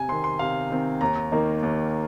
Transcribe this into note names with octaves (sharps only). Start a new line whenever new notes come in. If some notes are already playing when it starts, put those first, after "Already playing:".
Already playing: C3 G#5
D#3 C4 C6
C6
C3 F5
D#3 C4
D#2 A#5
D#3 A#3 D#4
D#2